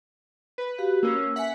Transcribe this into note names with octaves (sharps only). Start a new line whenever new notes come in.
B4
F#4 G4 F5
A#3 C#4 E6
E5 F#5 G#5 B6